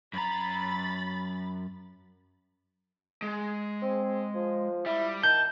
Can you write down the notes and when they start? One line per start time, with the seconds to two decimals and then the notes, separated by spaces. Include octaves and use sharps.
0.13 F#2 A#5 B5 A6
3.22 G#3
3.82 C4
4.34 F3
4.86 G3 E4
5.23 D#3 A5 G6